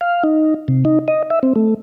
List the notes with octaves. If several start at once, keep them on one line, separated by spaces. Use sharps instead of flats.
F5
D#4
C3
D#4
D#5
E5
C4
A3